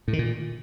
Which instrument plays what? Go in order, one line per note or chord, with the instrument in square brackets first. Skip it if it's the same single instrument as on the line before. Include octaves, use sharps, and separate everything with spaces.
[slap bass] A2
D#3
A#2